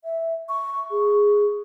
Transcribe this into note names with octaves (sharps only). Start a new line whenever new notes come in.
E5
C#6
G#4